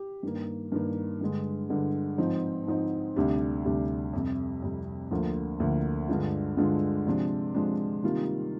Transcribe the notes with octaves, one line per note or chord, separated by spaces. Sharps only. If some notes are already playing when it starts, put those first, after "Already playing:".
Already playing: G4
G2 D#3 A#3
G2 D#3 A#3
G2 D3 G#3
G2 D3 G#3
G#2 F3 C4 D#4
G#2 F3 C4 D#4
D2 C3 G3 D4 G4
D2 C3 G3 D4 G4
F2 C3 G3
F2 C3 G3
D2 D3 F3 A#3
D2 D3 F3 A#3
G2 D3 G#3 D4 F4
G2 D3 G#3 D4 F4
C3 F3 G#3 D4
C3 F3 G#3 D4
C3 D#3 G3 A#3 F4